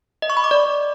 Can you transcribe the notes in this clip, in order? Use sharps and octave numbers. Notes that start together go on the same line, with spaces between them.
D#5
C#6
B5
D6
D5